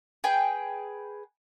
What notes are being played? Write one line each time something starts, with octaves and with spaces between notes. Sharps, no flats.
G#4 B4 G5